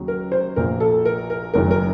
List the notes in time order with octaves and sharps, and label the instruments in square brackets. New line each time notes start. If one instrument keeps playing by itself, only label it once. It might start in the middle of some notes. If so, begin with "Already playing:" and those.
Already playing: [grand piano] D#2 C#3 F#3
A#4
C5
A#1 A#2 F3 A#4
A4
A#4
A#4
F#1 F#2 D#3 A#4
A#4